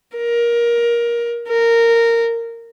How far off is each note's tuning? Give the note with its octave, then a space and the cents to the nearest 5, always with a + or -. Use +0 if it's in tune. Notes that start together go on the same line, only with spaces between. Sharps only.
A#4 +20
A#4 -10